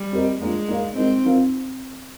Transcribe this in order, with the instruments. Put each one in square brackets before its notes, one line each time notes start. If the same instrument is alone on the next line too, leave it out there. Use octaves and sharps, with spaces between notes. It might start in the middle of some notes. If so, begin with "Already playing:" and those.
Already playing: [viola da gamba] G3
[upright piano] C4 G4 A#4 D#5
[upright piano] F3 A#3 D4 F4 [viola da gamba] G#3
[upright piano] A#3 D#4 A#4 D5 F5
[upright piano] G#3 D#4 A#4 D#5 [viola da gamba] C4
[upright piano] F3 C4 D#4 A#4 F5